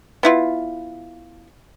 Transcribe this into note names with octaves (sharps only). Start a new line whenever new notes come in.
B3 E4 F4